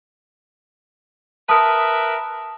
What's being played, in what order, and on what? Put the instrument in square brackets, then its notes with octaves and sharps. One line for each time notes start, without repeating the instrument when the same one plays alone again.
[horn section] A#4 B4 E5 [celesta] A5 D#6